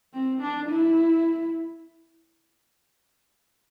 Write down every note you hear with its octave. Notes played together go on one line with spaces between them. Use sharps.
C4
D4
E4